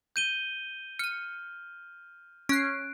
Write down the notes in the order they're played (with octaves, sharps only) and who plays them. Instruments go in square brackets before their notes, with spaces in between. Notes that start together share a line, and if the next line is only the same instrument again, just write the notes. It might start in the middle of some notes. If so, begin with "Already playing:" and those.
[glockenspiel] G6 D#7 G7
[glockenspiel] F6 [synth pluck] C#7 D#7
[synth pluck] C#4 C7 [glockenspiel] F#6 D7